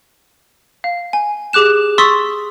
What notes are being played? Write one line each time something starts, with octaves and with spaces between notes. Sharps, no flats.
F5
G#5
G4 G#4 D6 F#6 E7
C6 C#6 D#6 E6 A6 B6